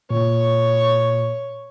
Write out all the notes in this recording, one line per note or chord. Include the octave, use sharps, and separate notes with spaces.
A#2 C#5